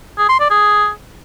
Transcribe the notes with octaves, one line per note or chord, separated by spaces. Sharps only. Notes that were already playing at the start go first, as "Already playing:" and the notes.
G#4
C6
D5
G#4